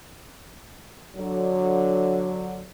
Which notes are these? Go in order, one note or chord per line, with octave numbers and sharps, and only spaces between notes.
D3 F#3